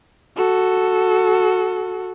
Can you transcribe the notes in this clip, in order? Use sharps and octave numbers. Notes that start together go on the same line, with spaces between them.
F#4 A4